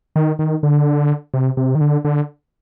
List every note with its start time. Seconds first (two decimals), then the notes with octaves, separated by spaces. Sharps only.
0.16 D#3
0.39 D#3
0.63 D3
1.34 C3
1.57 C3
1.75 D#3
1.81 D3
2.05 D3